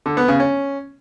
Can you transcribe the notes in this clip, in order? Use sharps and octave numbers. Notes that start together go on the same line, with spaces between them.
D3
B3
C#3
C#4